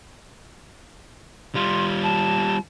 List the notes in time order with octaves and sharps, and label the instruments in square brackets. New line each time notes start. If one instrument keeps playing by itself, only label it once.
[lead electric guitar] G3 F4 [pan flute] C6
[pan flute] A5